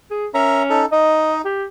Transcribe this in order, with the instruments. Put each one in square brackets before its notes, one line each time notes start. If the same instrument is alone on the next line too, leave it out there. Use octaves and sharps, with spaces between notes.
[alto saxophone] G#4
[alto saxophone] C#4 [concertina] A#4 E5 A#5
[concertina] D#4 A4
[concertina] D#4 [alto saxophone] D#5
[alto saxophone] G4